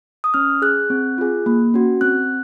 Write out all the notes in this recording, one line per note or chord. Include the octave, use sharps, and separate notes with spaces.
D#6
C#4 F6
G#4 F#6
C4
F4 G#4
A#3
C#4 F#4
C4 F#6